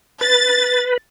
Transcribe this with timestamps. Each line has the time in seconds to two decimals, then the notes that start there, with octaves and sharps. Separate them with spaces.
0.21 B4 A6